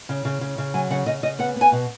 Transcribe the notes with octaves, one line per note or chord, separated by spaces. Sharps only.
C#3
C#3
C#3
C#3
F#3 G#5
C#3 F#5
C#3 D#5
C#3 D#5
B3 F#5
B3 G#5
B2